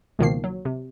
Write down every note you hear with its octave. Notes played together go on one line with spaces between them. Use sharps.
C#2 B2 D#3 F3 A#3 C7
F#3
C3